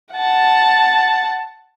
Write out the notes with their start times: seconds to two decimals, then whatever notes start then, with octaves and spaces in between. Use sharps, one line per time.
0.14 F#5 A5